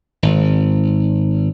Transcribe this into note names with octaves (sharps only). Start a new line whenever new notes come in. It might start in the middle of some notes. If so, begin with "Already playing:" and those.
G#1